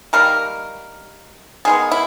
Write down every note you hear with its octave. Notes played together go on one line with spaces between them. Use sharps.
D#3 G3 A#3 A#4
D#3 G#3 B3 G#4
E4